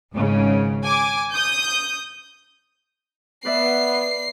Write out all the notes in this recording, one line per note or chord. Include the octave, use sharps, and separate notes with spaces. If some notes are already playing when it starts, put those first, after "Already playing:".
G#1 G#2 C#3
G#5 D6
D#6 G6
B3 B4 D5 E5 C7